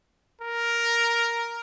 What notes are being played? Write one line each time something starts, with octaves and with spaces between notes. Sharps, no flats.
A#4